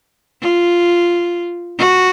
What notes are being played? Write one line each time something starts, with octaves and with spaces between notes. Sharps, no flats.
F4
F#4